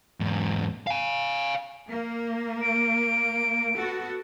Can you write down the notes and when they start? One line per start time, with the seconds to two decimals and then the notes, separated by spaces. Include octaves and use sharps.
0.20 E2 G#2
0.87 F5 G#5
1.88 A#3
2.62 D7
3.75 B3 F#4 A4